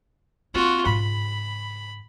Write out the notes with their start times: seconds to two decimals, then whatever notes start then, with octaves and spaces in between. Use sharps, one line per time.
0.54 A#3 C4 F4 F#4
0.86 G#2 C#3 B5